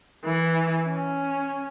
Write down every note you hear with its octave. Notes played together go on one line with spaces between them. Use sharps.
E3
C#4